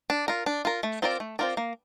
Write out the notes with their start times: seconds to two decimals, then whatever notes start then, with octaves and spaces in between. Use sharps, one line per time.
0.10 D4
0.28 F4 A#4
0.46 D4
0.65 F4 A#4
0.83 A3
1.02 C4 F4 A#4 D5
1.20 A3
1.39 C4 F4 A#4 D5
1.57 A#3